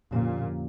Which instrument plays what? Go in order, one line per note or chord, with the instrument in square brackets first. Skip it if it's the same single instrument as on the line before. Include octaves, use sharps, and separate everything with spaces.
[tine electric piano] F2 D3 F3 C#4 G4 [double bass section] A#2